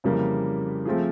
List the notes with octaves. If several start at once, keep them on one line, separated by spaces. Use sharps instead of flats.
F2 C#3 E3 G3 A#3
F3 A3 C4 F4 G#4